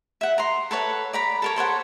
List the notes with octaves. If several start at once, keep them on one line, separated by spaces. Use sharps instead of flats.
E5 F#5
A#5 C6
A4 B4 C#5 F#5
D5 A#5 B5
A4 A#4 C#5
A4 C5 C#5 F#5